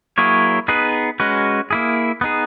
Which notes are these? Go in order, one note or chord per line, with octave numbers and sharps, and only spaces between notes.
F#3 A#3 E4 G#4 C#5
B3 D#4 G#4 B4
G#3 C#4 F#4 B4
A#3 E4 G#4
B3 D#4 G#4